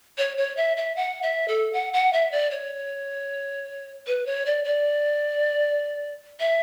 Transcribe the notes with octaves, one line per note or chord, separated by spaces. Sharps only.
C#5
C#5
E5
E5
F#5
E5
A4
F#5
F#5
E5
D5
C#5
B4
C#5
D5
D5
E5